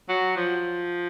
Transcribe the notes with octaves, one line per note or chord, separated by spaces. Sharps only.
F#3
F3